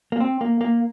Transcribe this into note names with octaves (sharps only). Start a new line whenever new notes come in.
A#3
C4
A#3
A#3